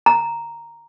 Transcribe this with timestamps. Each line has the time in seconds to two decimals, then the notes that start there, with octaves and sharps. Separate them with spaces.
0.06 A#5